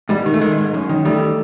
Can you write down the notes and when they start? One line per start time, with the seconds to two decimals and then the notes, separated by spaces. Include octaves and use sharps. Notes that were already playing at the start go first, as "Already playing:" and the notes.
0.09 G#2 G3
0.26 D#3
0.33 A3
0.41 D#3 G#3
0.58 G#2
0.74 F#2
0.89 D#3
1.05 D#3 G3 A3